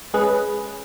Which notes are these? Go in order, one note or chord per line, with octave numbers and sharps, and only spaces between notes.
G#3 C#4 G#4 B4